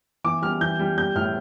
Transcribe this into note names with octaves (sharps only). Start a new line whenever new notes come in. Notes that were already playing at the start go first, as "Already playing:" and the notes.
E3 D6
G3 F6
E3 G6
G3
G3 G6
A2 F6